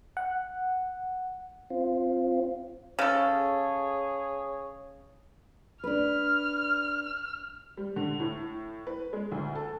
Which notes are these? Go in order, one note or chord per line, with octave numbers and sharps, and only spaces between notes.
F#5
C4 F4
C#3 G#4 A4 C#5
D4 B4 F6
G3
D3
A2
B4
G#3
D2
A4